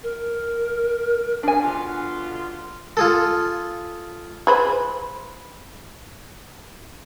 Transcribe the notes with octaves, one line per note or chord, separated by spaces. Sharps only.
A#4
E2 D4 G#5
B2 D3 F4
F4 G#4 A4
G#4 B4 C5